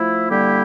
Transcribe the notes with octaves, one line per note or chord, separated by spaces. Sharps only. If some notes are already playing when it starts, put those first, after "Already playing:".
Already playing: F3 A3 E4
D3 G3 A#3 E4 G4